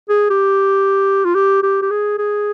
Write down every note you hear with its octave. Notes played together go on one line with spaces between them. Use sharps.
G#4
G4
F4
G4
G4
G4
G#4
G#4